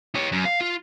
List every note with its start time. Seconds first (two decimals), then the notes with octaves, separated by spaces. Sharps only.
0.15 G4 C#5
0.32 F#2
0.45 F5
0.61 F4